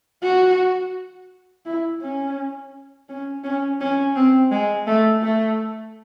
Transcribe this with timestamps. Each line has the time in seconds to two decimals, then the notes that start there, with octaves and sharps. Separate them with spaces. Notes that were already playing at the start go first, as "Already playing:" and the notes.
0.23 F#4
1.66 E4
2.02 C#4
3.09 C#4
3.44 C#4
3.81 C#4
4.16 C4
4.52 G#3
4.87 A3
5.22 A3